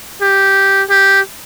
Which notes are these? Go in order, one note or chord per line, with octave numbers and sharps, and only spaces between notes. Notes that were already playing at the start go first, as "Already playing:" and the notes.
G4
G4